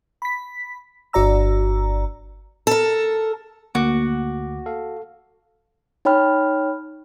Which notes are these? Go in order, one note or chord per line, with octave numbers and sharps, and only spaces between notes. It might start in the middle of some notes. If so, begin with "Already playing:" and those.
B5 B6
G1 F#4 D5 A#5 E6
A4 A#4
D2 A#3 F#4 D6
A4 F5
D#4 C#5 G5 B5 F6